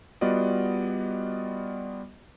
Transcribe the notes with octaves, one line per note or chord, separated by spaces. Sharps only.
G3 B3 F4 F#4 D5 D#5